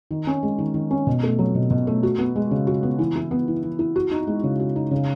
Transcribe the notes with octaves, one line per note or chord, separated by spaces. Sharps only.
D#3
C#4
G#3
D#3
D#3
C#4
B2
A3
F#3
B2
B2
A3
F#4
B3
G#3
C#3
F#4
B3
E3
E4
B3
E3
E3
E4
F#4
D#4
G#3
C#3
F#4
D#4
C#3